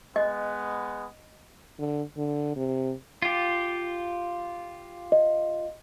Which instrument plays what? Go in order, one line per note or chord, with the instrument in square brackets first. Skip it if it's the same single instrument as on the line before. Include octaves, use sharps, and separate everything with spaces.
[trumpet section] G#3 B3 [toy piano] D#5
[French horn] D3
D3
C3
[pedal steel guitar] F4 G4
[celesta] D#5